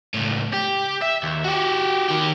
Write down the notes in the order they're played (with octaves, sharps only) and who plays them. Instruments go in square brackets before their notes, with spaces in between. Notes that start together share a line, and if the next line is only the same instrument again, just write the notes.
[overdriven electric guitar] C#2 A2
G4
E5
D#2
F#4 G4
D#3 G4